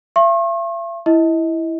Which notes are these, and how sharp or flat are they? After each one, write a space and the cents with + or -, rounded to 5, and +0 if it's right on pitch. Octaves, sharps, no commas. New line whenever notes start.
E5 +45 C#6 -45
E4 +0 D#5 +30